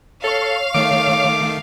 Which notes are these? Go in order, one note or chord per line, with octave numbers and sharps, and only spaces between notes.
A4 C#5 F5
D#3 A3 D6